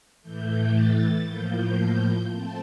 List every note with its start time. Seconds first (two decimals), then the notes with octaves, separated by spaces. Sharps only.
0.22 A2 E3 A3 G6
0.74 A6
1.25 A2 F3 A#3 G6
2.29 A3 C4 A5